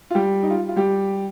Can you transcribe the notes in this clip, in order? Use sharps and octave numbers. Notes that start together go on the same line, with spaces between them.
F4
G3 G4
D#4
F4
F4
G3 G4